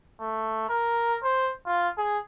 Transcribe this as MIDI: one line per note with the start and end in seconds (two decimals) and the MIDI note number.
0.20 0.66 57
0.69 1.18 70
1.23 1.52 72
1.66 1.89 65
1.97 2.18 68